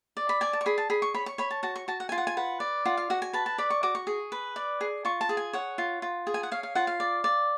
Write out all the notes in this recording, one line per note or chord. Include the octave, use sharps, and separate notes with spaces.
D5
B5
D5 G#5
A5
C#6
G#4 B5
A5
G#4 B5
C#6
C#5 B5
C#6
C#5 B5
A5
F#4 A5
C#6
F#4 A5
F#5
F4 G#5
F#5
G#5
B4 F#5
D5
F4 F#5
F5
F#4 F#5
G#5
B4 A5
A5
D5 B5
C#6
F#4 D6
C#6
G#4
B4
D5
G#4
F4 C#6
A5
G#4
G#5
C#5 F#5
F4
F4
G#4
G#5
F#5
C#5 F5
F5
F4 F#5
F5
D5
D5